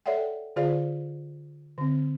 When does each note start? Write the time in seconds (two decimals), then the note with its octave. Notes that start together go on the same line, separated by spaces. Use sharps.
0.06 A4 C#5 D5 E5 F#5 G5
0.56 D3 F4 G#4 C5 D5 F5
1.78 D3 C4